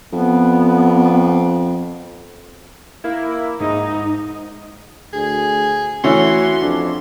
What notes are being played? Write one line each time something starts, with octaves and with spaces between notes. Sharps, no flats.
F2 B3
A#3 E4
G#2 D#4
D2 G#4
E3 A3 C#4 F#4 C6
F2 D4